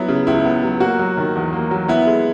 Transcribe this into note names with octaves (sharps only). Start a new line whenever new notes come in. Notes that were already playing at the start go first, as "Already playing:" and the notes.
Already playing: F#3 B3 E4
C#3
C#2 E4
B3
F#3
A#3 F#4
F#3
D#3
E2
A#3
F#3
B3 E4
G#3